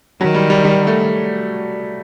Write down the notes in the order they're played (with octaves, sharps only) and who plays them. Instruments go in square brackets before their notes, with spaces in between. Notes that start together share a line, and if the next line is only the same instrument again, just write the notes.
[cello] D#3 [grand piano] F#3
[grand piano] G3
G3
G3
A3